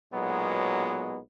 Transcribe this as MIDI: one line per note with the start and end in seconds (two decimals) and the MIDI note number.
0.13 1.18 35
0.13 1.18 46
0.13 1.18 54
0.13 1.18 56
0.13 1.18 59